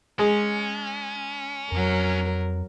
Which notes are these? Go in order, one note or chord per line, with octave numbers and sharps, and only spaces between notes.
G#3 C#4
F2 F#3 A#4